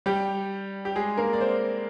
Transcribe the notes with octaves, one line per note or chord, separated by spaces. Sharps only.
G3 G4
G4
G#3 G#4
A#3 A#4
D5
C4 C5